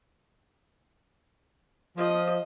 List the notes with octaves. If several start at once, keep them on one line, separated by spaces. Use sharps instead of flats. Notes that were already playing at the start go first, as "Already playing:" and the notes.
F3 D#5 D#6